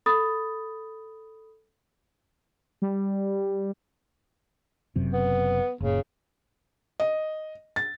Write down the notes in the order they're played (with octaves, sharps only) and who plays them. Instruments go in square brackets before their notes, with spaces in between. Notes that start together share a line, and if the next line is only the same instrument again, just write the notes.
[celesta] A4 B5 D#6 A6
[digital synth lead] G3
[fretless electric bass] F#1 F#2 C3
[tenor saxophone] B3
[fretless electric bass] F#1 A#2 [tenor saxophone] C#3
[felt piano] D#5
A6